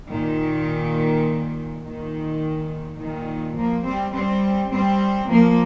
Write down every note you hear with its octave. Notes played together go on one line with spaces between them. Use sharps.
A#2 D#3
A#2 D#3
A#2 D#3
F3 A#3
G3 C4
G3 C4
G3 C4
F3 A#3